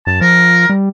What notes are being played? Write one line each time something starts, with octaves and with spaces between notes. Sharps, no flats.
F#2 A5
F3 A#4
G3